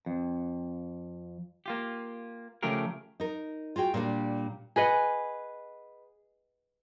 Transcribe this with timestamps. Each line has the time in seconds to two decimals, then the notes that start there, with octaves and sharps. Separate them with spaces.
0.06 F2
1.66 A#3 F4 G4
2.63 C#3 F3 A3 G4 G#4 A#4
3.20 D#4 A#4
3.76 F4 F#4 G#4 G5
3.94 A#2 G3 A#3 C4 D4
4.76 G#4 B4 D#5 F#5